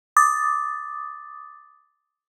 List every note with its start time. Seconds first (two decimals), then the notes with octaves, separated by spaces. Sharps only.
0.17 D6 D#6 A6